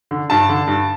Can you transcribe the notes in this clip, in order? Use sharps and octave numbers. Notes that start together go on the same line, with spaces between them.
D3
G2 A5
D3
G2